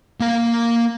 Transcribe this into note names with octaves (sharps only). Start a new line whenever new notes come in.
A#3 F5